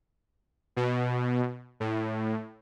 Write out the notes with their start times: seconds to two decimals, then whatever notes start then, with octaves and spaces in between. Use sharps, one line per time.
0.76 B2
1.80 A2